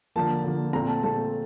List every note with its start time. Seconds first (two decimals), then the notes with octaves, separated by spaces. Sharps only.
0.16 D3 F3 A#3 A5
0.44 D3 F3 A#3
0.73 A#2 A3 C4 A#5
0.88 A5
1.03 A#2 A3 C4 A5